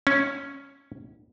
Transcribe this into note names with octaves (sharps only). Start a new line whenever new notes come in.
C#4